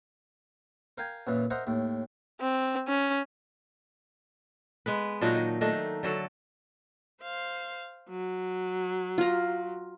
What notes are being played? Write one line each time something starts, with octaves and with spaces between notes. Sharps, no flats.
A#4 F5 G5 G#5
F#2 A#2 E3
A#4 C5 D#5 E5 F#5 A#5
D#2 A2
C4
C#4
G#3 B3 B4
A#2 F#3 D4 D#4
D#3
D#3 A3 D4 D#4
D3 F#3 A4
C5 F5
F#3
F4 A#5